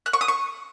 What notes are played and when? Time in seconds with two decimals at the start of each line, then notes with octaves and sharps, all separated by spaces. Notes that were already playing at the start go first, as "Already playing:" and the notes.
0.06 F#6
0.13 C#6
0.21 D#6
0.28 C#6